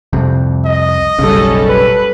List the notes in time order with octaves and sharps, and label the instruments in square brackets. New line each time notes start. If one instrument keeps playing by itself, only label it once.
[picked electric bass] C2 F2 C3
[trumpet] D#5
[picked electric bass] F#1 B1 C#3 [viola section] G3 C#4 A4
[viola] B4